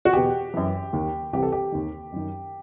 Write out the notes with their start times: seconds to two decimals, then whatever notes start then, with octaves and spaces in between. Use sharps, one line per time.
0.05 F#4
0.13 E2 B2 G4
0.54 F#2 E3
0.93 D#2 D#3
1.33 C2 C3 E3 G4
1.42 A4
1.52 G4
1.72 D#2 D#3
2.12 F#2 D#3